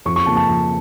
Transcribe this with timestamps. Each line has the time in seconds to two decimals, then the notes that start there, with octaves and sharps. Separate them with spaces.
0.06 F2 C#6
0.16 C#6
0.26 C#3 F3 A#3 A5
0.36 A5
0.47 F2